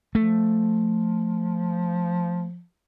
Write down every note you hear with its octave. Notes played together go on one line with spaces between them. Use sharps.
F3 A3